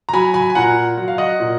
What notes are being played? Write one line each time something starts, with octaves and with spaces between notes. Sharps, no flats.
A#5
F#3 G#5 B5
G#5 B5
G#5
A#2 F#5 A#5
F#3 F#5
F5
D#5 F#5
A#2